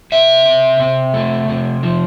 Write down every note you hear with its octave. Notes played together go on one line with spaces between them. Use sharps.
C3 E5
C3
C3
A3
C3
F3